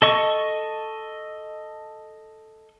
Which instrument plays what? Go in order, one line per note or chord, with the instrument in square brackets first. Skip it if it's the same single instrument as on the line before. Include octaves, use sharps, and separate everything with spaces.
[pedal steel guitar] A4 D#5 C#6